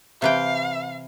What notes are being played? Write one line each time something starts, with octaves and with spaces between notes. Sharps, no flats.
C3 E3 F5 G5